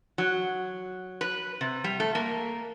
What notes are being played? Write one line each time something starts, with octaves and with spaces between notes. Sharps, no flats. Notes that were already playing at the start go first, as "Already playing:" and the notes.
F#3
B4
C3
G3
A3
A#3